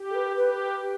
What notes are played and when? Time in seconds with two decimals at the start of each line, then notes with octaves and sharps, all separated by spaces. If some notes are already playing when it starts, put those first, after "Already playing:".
Already playing: G4
0.10 A4
0.15 B4
0.36 G4 B4
0.80 G4